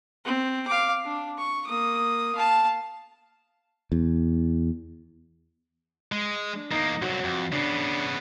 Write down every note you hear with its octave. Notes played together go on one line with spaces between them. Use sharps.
C4
F5 D6
D4
C#6
A#3 D#6
F5 A5
E2
G#3
D4
E2 A#3 D#4
C2 F#3 F#4
F2
C#3 B3 D4